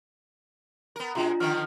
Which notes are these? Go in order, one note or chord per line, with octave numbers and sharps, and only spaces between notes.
B3 A#4
B2 G#3 D4 F4 A#5
D3 D#3 F3 F6